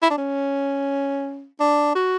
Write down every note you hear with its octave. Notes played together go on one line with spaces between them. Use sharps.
E4
D4
C#4
D4
F#4